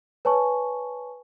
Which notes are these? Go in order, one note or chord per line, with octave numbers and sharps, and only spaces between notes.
B4 C#5 G#5 A5 C#6